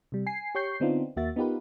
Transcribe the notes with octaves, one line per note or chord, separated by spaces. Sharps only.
C3 G3
G#5 C7
G4 C#5 C#6 G6 C7
D3 B3 C4 D4 D#4 F4
D#2 A#3 F#4 E5 A6
B3 D#4 F4 G4 A#4 B4